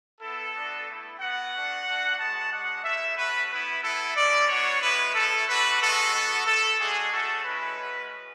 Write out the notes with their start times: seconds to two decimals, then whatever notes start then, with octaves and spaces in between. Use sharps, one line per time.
0.21 B3 E4 A4
0.54 B3 D4 F#4
0.87 A3 E4
1.20 B3 F#4 F#5
1.53 A3 D4 F#4
1.86 A3 D4 F#4
2.19 G#3 B3 F#4 A5
2.52 G#3 D4 F#4 F#5
2.84 A3 C#4 E4 E5
3.17 A3 C#4 F#4 B4
3.50 B3 E4 B4
3.83 B3 E4 A4
4.16 G#3 C#4 E4 D5
4.49 B3 D4 F#4 C#5
4.82 G#3 B3 E4 B4
5.14 A3 C#4 E4 A4
5.47 A3 D4 F#4 B4
5.81 G#3 B3 F#4 A4
6.14 B3 F#4
6.46 A3 E4 A4
6.80 G#3 D4 F#4 G#4
7.12 A3 C#4 F#4 A4
7.45 G#3 C#4 E4 B4
7.78 G#3 C#4 F#4